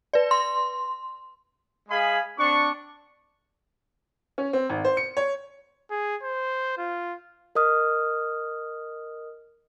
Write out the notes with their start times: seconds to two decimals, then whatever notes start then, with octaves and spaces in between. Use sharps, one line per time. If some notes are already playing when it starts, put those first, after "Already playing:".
0.13 B4 D5
0.31 C6
1.89 G#3 G#4 D#5 F5 G#5 B5
2.38 C4 D4 C#6
4.38 C#4
4.53 C4
4.70 G#1
4.85 C5
4.97 C#7
5.17 C#5
5.90 G#4
6.23 C5
6.78 F4
7.55 A#4 D#5 D#6 F6